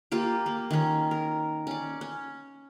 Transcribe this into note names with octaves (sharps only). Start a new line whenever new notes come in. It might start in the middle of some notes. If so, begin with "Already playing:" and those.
A#3 F4 G4
A#3
D#3 C#4
A#4
C#4 D5
C#4